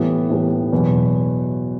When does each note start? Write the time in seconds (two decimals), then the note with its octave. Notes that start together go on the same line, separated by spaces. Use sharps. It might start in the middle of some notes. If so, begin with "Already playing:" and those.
Already playing: A2 E3 G3 B3
0.30 A2 E3 G3 B3
0.73 E2 B2 F#3 B3